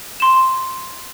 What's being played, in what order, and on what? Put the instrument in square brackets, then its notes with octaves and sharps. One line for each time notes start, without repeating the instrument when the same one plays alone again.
[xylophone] C6 E7